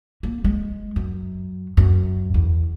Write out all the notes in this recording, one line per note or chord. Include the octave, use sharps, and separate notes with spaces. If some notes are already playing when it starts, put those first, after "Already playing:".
A#3
G#3
F#2
F#2
E2